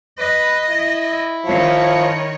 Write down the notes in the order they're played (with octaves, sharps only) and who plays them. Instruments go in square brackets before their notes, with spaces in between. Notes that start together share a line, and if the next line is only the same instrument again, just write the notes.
[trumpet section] B4 [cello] D#5
[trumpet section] E4
[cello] D#3 C#5 [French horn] F3